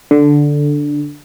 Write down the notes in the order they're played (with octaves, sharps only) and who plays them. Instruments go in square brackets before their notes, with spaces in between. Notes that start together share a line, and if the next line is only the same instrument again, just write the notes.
[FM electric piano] D3